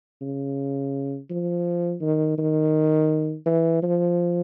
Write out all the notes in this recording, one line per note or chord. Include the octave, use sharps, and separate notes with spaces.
C#3
F3
D#3
D#3
E3
F3